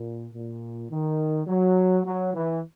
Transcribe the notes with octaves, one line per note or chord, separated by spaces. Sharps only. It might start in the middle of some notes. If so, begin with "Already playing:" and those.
Already playing: A#2
A#2
D#3
F#3
F#3
E3